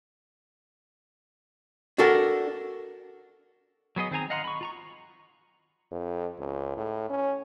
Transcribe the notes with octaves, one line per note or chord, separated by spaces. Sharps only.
D4 F#4 A4 A#4
F#3 B3 G#4 D#5
D#3 C4 G#4 G#5 A#5
D#5 F5 F#5 A#5 C6
B5 C#6
F4 A#5 C#6
F2
C#2
A2
C#4